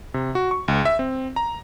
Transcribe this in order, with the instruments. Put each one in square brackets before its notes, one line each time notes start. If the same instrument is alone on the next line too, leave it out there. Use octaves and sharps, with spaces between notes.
[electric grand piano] C3
F#4
C#6
C#2
E5
C4
A#5